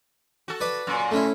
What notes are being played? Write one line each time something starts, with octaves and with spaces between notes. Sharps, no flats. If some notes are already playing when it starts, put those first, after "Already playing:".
F#4 A4
B4 D5 B5
F#2 A#2
A3 C#4 E4